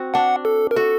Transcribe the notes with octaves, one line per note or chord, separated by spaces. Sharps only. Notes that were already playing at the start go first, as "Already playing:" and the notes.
Already playing: C4 F#4
D4 F#5
A4
A#4
F#4 A4